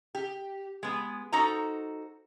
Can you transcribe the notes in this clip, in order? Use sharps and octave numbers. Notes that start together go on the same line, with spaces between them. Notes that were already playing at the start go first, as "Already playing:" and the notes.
G4
G#3 B3
D#4 F#4 A4 C5 A#5